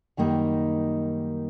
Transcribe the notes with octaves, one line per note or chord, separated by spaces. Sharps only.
F#2 D#3 G3 A#3 D#4